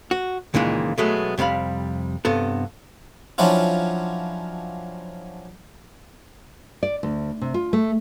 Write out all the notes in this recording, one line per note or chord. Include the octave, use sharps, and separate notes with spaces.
F#4
C#2 A#2 D#3 E3 G#3
B2 F#3 G#3 A3 B3
F2 C3 G3 F5 B5
G2 C3 B3 A4
F3 F#3 C#4 D4 E4 F4
D5
D2
C3
F4
A3